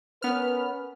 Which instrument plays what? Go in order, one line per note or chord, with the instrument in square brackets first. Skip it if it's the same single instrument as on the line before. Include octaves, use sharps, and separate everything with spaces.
[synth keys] B3 F6 [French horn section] C#4 A#4 B4